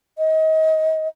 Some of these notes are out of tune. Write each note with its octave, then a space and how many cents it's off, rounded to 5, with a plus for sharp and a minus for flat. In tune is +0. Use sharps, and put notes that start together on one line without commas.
D#5 +30